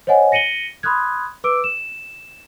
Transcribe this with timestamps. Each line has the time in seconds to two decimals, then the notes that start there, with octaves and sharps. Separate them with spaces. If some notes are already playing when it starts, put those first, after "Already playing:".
0.07 C5 C#5 D#5 F#5 G#5
0.32 A#6 C#7 D#7 F#7 G7
0.83 B5 C6 D#6 F6 F#6 G#6
1.44 B4 D6 E6 D7
1.64 E7